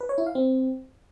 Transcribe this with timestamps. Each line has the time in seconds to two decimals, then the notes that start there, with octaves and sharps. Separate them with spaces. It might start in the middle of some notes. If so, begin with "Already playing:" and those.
0.01 B4
0.09 C#5
0.18 E4
0.27 F5
0.35 C4